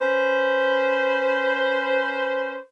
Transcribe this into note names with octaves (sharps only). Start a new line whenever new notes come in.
C#4 B4 C5